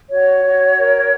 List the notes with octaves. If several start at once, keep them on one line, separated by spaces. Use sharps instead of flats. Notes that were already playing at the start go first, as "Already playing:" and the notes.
F#4 C#5
F#4
A#4